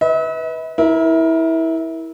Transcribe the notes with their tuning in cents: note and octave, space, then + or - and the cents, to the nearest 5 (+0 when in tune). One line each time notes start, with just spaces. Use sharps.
B4 +0 E5 -45
E4 -20 A#4 +15